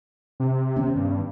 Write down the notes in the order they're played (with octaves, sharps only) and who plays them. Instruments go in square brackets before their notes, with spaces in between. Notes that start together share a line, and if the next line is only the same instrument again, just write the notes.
[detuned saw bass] C3
[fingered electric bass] D#3 B3 C#4
[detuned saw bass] G2